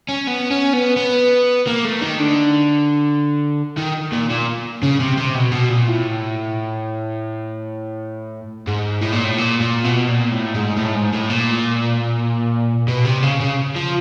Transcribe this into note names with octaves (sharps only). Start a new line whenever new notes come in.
C#4
B3
C#4
B3
B3
A#3
A3
D#3
D3
D#3
A#2
A#2
C#3
C3
C3
B2
B2
A#2
A2
G#2
A2
A#2
A2
A#2
A#2
B2
A#2
A2
G#2
A2
G#2
A2
A#2
B2
C3
C#3
C#3
F3